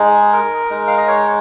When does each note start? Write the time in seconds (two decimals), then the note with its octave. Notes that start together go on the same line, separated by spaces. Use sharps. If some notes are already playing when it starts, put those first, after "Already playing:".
Already playing: G#3 D#4 G#4
0.33 A#4
0.70 G#3 D#4
0.87 F5
0.97 D#5
1.08 C#5